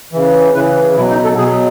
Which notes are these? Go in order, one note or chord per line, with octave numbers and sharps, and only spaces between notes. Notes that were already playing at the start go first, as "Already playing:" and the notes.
C#3 E3
C#3 E3 B4
G#4
B2 F#3 E4
D#4
A4
B2 F#3 G#4